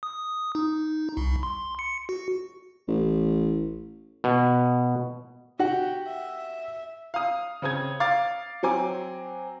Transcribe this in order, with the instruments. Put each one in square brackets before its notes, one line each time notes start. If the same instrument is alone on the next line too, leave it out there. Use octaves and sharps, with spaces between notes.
[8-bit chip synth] D#6
D#4
C2
C6
C#7
F#4
[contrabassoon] A1
[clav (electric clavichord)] B2
[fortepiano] F#4 F#5 [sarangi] G4
[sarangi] E5
[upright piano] F5 D#6
C#3 C4 D#6 G#6
F5 D6 A6
F#3 C4 G#5 D6